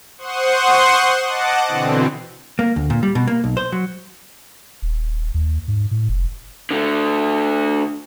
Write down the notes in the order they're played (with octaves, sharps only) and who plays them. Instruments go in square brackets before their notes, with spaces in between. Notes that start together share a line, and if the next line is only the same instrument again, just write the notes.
[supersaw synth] C5 F#5 C6 C#6 D#6
D#5 F#5 A5 D6
B2 D3 E3 C4
[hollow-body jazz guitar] A#3
D2
A#2
G3
B2
A#3
B1
C5
F#3
[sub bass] D#1
D#2
G#2
A2
F1
[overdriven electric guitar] D3 A3